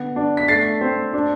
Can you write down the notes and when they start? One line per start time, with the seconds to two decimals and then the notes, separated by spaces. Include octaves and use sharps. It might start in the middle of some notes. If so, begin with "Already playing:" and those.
Already playing: D3 B3
0.16 D4
0.37 B6
0.48 A3 A6 C7
0.81 C4
1.13 D4